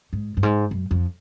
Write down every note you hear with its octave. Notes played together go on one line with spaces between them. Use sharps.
G#2
G2
G#2
F#2
F2